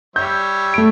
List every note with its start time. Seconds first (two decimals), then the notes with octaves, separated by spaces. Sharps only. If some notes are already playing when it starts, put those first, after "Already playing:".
0.16 G3 C#5 E5 G6
0.74 A3 D7